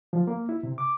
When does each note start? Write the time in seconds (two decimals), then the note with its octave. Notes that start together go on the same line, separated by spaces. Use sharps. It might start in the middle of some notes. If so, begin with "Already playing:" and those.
0.13 F3
0.27 A#3
0.49 E4
0.63 C3
0.78 D6